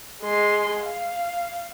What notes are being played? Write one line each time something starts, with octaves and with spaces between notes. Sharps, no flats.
G#3 C6
F5